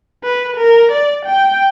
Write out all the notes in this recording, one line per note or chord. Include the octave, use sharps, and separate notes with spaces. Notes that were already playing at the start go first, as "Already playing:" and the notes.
B4
A#4
D5
G5